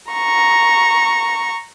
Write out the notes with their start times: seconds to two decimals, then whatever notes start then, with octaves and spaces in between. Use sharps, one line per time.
0.12 A#5 C#6